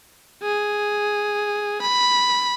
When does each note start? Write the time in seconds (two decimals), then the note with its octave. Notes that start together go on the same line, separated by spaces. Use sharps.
0.42 G#4
1.81 B5